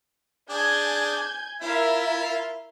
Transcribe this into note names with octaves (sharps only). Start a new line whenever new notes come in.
D4 G#4 G#5 G6 G#6
E4 F4 A#4 E5 F5